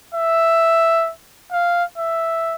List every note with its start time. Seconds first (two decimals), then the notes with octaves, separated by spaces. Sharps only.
0.14 E5
1.52 F5
1.98 E5